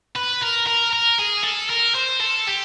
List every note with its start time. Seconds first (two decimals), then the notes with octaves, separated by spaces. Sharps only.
0.16 B4
0.43 A#4
0.67 A#4
0.93 A#4
1.19 G#4
1.44 A4
1.70 A#4
1.95 C5
2.21 A4
2.47 G4